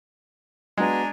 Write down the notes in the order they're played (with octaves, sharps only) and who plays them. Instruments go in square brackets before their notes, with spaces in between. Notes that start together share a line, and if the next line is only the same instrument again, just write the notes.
[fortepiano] G#3 [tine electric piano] B3 F#4 [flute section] D4 G#5 A#5